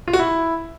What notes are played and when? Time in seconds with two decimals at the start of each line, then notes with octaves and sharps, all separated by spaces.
0.08 F4
0.13 F#4
0.19 E4